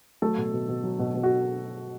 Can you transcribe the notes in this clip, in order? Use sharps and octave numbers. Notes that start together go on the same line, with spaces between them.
F#3 A3 A4
B2
B2
B2
F#3
B2
B2
F#4